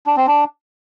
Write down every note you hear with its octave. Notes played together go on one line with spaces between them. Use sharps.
D4
C4
D4